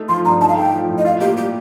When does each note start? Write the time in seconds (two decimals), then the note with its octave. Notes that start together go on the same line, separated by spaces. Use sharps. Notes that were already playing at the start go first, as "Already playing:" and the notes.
Already playing: A3 D#4
0.09 F3 C6
0.25 G2 A#5
0.41 D#4 A5
0.48 F5
0.57 A3 G5
0.73 F3
0.89 A2
0.98 D#5
1.05 F4 F5
1.21 A#3 G4
1.37 G3 G4